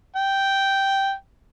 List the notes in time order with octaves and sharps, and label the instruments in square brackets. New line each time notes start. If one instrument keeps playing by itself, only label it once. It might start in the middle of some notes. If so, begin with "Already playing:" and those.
[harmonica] G5